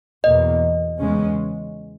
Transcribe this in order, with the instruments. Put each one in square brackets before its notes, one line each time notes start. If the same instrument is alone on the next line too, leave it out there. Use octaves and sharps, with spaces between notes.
[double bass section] E2 B2 A#3 [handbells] D#5
[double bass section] E2 C#3 G#3 C#4